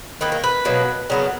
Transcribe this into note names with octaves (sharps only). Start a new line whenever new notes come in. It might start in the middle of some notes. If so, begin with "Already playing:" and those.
D#3 A#3 B4
A#4
B4
B2 F#3 A#3
C#3 F#3 B3 A#4